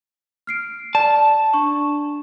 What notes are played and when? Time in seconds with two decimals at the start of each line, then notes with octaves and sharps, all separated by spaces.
0.47 F6 C7 D7
0.95 D5 A5
1.54 D4 C#6